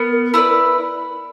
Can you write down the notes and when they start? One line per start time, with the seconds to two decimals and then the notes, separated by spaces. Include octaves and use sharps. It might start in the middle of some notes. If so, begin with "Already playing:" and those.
Already playing: B3 A#4
0.34 E4 B4 D5